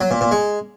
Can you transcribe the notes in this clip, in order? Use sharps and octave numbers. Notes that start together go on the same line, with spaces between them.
F#3
A#2
A#2
G#3